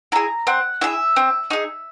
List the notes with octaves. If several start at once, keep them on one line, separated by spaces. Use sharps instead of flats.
E4 G#4 A#5
C4 F#5
E4 G#4 E5
C4
D#4 G#4